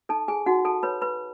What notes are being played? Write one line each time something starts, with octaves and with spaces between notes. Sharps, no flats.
D#4 A4 A5
G#4 G#5
D#4 F#4 F#5
A4 A5
B4 C#5 B5
B4 B5